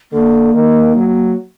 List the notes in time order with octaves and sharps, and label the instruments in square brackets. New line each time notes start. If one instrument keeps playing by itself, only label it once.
[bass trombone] D3 [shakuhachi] A#3
[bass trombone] D#3
F#3